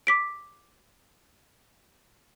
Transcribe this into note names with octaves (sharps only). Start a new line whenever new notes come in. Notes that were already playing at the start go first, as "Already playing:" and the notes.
D6 B6 D7